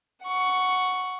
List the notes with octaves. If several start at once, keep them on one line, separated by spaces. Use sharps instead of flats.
F#5 C#6